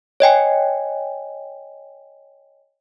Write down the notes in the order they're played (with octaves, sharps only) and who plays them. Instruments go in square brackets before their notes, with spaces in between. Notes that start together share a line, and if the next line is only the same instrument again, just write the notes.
[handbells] C#5 D#5 G5 G#5